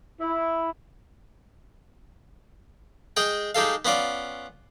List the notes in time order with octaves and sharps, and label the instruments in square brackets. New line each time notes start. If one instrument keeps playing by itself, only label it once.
[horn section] E4
[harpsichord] G#3 G#4 G5
G#3 D#4 G4 A4 F5
B3 C#4 F4 D5